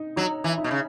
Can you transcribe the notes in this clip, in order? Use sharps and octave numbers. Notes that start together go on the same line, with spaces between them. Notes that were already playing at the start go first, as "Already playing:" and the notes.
Already playing: D#4
F#3 D#4
E3
D#4
B2
C#3